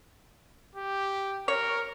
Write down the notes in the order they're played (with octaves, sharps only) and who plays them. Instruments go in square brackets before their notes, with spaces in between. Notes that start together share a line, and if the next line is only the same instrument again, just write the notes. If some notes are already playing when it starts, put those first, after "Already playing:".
[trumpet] G4
[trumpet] A#4 [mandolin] C#5